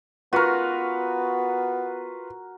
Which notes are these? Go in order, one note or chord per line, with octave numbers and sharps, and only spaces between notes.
B3 F4 F#4 A#4 B4 C#6